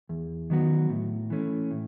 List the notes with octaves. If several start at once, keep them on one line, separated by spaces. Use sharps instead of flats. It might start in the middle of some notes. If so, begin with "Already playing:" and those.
E2
D#3 F#3 B3 F#4
A2
E3 A3 C#4
A2